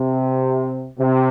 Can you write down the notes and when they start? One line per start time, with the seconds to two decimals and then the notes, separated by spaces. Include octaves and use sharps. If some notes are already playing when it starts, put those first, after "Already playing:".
Already playing: C3
0.99 C3